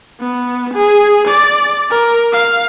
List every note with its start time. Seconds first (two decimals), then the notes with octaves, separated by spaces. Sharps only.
0.20 B3
0.74 G#4
1.28 D5
1.90 A#4
2.33 F5